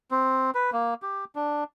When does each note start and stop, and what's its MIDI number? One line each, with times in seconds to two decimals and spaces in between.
0.11 0.51 60
0.55 0.70 71
0.73 0.94 58
1.02 1.25 67
1.35 1.64 62